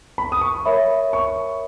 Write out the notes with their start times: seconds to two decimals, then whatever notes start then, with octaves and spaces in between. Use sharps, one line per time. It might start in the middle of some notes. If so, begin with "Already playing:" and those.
0.18 B5
0.32 D#6
0.42 C#6
0.65 A#4 C#5 E5 B5
1.13 C#6